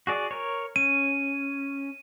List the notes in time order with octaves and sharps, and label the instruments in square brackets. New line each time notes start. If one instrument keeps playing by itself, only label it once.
[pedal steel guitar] F#4 G#4 D5
A#4 C#5
[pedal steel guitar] C#4 [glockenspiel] D#7